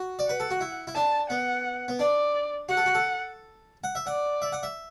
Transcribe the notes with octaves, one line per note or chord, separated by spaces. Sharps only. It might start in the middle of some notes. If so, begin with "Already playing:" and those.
Already playing: F#4
D5
B4 F#5
A4
F#4
E4
E4
D4 A5
B3 F#5
B3
D4 D5
F#4 F#5
A4
F#4
A4
F#5
E5
D5 F#5
E5
F#5
E5